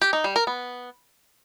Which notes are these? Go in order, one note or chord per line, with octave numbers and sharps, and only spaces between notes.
G4
D#4
G3
A#4
B3